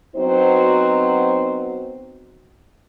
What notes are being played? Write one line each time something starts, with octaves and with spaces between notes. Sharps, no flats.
F#3 B3 C4 D#4 F#4 C5